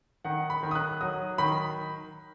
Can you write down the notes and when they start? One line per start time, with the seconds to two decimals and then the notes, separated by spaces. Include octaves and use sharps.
0.25 D#3 F#5
0.50 B5
0.63 D#3
0.71 D#6
0.75 F#6
1.01 F#3 D#6
1.38 D#3 B5